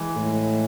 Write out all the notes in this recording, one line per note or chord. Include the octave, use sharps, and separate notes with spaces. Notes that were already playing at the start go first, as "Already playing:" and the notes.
Already playing: E3 G#3
A2